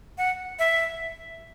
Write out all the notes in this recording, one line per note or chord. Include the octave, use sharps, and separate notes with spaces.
F#5
E5